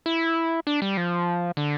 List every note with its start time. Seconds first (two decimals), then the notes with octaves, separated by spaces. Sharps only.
0.06 E4
0.67 D4
0.82 G3
0.97 F3
1.57 D3